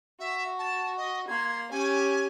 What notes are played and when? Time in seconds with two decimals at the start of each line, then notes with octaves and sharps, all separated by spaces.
0.20 F#4 E5
0.59 A5
0.97 D#5
1.28 A#3 C6 G#6
1.71 C#4 G4 G#5